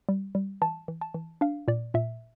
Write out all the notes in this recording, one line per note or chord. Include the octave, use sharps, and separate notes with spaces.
G3
G3
E3 A5
E3
A5
E3
D4 F5
A#2 D5
A#2 E5